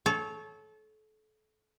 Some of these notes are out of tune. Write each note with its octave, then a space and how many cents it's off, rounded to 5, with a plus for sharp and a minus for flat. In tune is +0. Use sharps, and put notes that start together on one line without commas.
A4 -30 C#5 +0